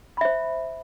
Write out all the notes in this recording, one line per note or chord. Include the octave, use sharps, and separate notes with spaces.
C5 E5 B5